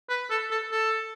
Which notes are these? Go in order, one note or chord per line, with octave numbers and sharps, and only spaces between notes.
B4
A4
A4
A4